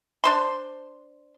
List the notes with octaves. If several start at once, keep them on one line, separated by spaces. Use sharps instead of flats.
D4 C5 C6